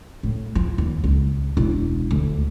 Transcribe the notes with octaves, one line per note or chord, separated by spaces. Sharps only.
A2
F3
D#2
C#2
E1
D2